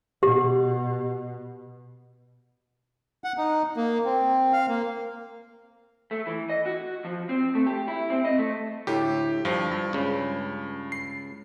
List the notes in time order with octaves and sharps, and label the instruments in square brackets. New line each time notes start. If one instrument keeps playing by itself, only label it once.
[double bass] B2 [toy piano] G4
[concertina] F#5
D#4
A#3
C4
F5
A#3
[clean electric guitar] A3
E3
D#5
F#4
F3
C4
A3
G4
E4
C4
D#5
A3
[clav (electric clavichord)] D2 A2 [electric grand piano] G4
[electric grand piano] G2 [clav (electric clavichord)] F3
[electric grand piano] G2
[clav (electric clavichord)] C#2 C#3
[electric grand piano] C7